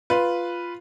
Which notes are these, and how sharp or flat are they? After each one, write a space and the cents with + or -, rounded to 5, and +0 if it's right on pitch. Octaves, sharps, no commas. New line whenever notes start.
F4 -5 B4 +0